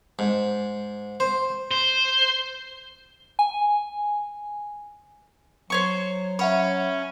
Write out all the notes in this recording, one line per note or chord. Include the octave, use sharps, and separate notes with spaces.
G#2
C5
C5
G#5
F#3 C5 C#5 C#6
C#4 C#5 E5 F#5 B5